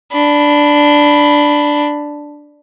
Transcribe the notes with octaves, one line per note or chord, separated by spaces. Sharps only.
D4 B5